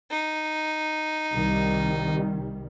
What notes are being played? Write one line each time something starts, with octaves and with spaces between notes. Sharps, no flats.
D#4
C2 D#3 G3